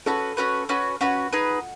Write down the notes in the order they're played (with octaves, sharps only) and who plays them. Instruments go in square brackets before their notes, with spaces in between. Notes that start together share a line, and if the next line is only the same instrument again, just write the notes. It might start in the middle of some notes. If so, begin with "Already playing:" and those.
[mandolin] C#4 F#4 B4 [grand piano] A4
[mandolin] C#4 F#4 B4
C#4 F#4 B4
[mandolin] C#4 F#4 B4 [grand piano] F#5
[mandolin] D#4 G#4 B4